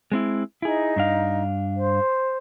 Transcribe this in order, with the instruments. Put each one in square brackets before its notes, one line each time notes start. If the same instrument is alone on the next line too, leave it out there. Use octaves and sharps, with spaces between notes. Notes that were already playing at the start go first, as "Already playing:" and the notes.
[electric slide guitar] G#3 C4 E4
[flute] D#4 [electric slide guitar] E4 G#4
[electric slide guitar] G2 D4 F5
[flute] C5